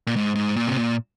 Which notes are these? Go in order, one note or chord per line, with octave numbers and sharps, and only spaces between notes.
A#2
G#2
G#2
A#2
C3
A#2